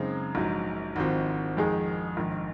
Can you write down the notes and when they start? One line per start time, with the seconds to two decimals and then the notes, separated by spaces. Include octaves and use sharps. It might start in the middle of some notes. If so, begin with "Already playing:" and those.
Already playing: F#2 C#3 G#3 C4 D#4
0.35 A#1 G#2 F#3
0.96 G#1 G#2 F3 C4 F#4
1.57 F2 D#3 G#3 D#4 G#4
2.17 A#1 G#2 D#3